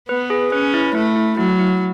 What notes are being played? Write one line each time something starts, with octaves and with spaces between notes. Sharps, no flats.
B3 B4
G#4
C#4 B4
E4
A3 E4
E4
F#3 E4
E4